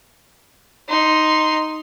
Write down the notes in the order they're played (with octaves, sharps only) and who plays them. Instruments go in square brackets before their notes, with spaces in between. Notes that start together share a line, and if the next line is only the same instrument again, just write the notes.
[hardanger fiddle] D#4 C6